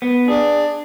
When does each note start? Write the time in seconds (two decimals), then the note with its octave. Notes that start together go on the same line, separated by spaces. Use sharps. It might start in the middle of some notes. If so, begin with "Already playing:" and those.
0.02 B3
0.28 D4 G#4